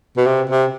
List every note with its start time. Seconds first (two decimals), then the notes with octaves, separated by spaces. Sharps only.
0.17 B2
0.26 C3
0.49 C3